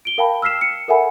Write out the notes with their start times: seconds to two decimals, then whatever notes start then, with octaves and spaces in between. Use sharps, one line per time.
0.05 D7 G7
0.18 A#4 F5 G5 A5 B5
0.42 E6 F6 B6 C7 E7
0.61 C#7
0.88 A4 A#4 E5 F#5 G#5 B5